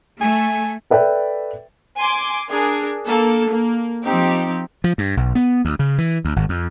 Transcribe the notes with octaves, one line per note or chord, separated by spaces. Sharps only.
A3 G#5
A4 B4 D5 E5 G5
G#5 C6 D6
D4 G#4 A#4
A#3 A4
A#3
F3 C4 D#4 G4
F3
G2
B1
B3
D2
C#3
E3
D2
G#1
F2